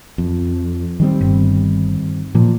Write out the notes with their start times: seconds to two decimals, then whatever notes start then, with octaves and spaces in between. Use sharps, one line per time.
0.18 F2
1.00 D#3 G3 C4
1.21 G1
2.35 A#2 F3